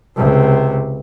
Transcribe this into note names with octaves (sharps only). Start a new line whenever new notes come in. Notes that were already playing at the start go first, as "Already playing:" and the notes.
C#2 C3